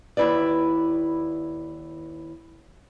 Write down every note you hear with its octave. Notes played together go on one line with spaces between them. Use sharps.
D#2 G#2 E4 B4 D5